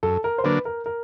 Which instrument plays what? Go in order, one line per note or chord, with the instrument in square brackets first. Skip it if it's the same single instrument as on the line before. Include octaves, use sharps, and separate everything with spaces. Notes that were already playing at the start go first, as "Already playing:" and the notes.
[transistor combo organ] F#2 [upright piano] A4
[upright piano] A#4
C5
[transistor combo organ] D3 F#3 A#3 D4 [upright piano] B4
[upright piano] A#4
A#4